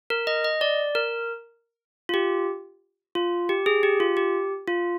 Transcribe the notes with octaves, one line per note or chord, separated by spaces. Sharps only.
A#4
D#5
D#5
D5
A#4
F4
G4
F4
G4
G#4
G4
F4
G4
F4